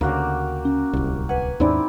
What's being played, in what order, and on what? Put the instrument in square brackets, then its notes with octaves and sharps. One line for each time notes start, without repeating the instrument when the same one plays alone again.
[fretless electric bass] D2 C#3 [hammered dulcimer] A#3 F#4 G4
[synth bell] C#4
[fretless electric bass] D1 C2
[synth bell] B4 F#5 [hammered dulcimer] G#5
[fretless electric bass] D#2 G#2 C#4 [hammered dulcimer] C4 E4 G4 [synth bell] D#4 D5